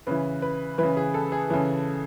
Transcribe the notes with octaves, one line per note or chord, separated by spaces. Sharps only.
C#3 E3 B4
B4
C#3 E3 B4
G#4
A4
G#4
C#3 E3